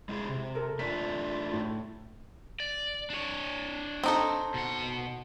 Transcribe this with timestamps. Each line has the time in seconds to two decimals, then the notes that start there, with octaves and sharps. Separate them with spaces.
0.09 G#3 E4 G#4
0.29 C3
0.55 A4 A#4
0.79 A3 D4 F4 B6
1.53 A2
2.60 D5
3.10 D4 C#5
4.03 C4 D#4 A4
4.54 B2 F#5